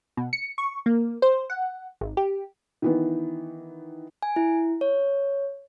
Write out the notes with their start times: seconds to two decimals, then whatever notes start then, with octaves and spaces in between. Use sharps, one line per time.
0.17 B2
0.33 C#7
0.58 C#6
0.86 A#3
1.22 C5
1.50 F#5
2.01 G#1
2.17 G4
2.82 D#3 E3 B3
4.23 G#5
4.36 E4
4.81 C#5